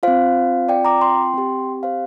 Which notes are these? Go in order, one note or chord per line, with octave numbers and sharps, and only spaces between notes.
C4 F4 C5 F5
D5 G5
A#5 D6
G5 C6
C4 G4
C5 F5